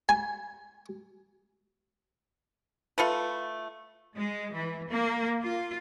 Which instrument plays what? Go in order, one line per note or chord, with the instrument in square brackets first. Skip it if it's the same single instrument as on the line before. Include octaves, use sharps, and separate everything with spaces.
[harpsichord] G#5
[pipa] A3 F4 A4 B4
[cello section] G#3
E3
A#3
F4